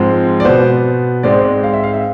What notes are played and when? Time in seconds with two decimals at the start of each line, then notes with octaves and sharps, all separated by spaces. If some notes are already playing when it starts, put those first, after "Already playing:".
Already playing: G#2 F3 G#3 C4
0.40 D5
0.45 B2 B3 C5
1.23 G#2 G#3 C4 D5
1.32 C5
1.40 D5
1.64 F5
1.74 E5
1.84 F5
1.94 E5